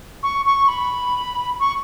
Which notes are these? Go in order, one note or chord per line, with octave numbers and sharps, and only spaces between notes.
C#6
C#6
B5
C#6